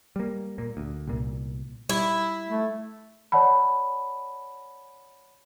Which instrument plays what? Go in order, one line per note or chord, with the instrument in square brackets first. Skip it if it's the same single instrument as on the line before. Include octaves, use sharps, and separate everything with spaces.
[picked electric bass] G3 A#3
A#2 A#3
D2
C2 A#2
[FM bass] G3 [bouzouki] E4
[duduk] A3
[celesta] C#5 D5 F#5 A5 B5